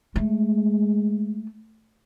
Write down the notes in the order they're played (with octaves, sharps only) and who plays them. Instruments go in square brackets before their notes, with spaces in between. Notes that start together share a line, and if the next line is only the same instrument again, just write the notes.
[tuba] G#3 [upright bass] A3